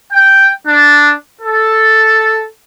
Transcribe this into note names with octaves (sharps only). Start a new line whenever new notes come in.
G5
D4
A4